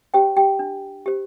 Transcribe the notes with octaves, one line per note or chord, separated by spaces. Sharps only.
G4 C5 G5
G4 G5
D4
G4 C5